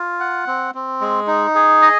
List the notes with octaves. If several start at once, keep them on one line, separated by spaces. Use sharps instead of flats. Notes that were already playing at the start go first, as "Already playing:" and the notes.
Already playing: F4
F#5
C4
C4
G#3
D#4
G#4
D#5